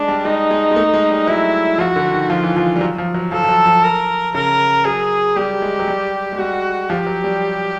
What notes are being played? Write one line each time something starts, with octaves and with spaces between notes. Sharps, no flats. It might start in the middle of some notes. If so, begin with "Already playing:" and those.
Already playing: G#3 D4
G3
G#3 D#4
G#3
G#3
A3
G#3
G3
F#3 E4
F3 F#4
D3
D#3
F3 F4
E3
F3
G3
F#3
F3
F#3
F3 A4
F3
F#3
F3
A#4
C#3 A#4
F#3 G#4
G3 G4
G#3
F#3
G3
G#3
G3 F#4
F3 G4
F#3
G3